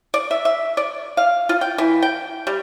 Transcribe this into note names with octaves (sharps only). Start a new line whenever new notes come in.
D5
E5
E5
D5
F5
F4
G5
E3
G5
G3